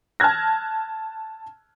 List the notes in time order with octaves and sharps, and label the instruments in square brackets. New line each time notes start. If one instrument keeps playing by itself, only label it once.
[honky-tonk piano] A5 F6 F#6 G#6 A#6